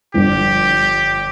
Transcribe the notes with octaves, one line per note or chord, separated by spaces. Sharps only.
G1 G2 F3 G4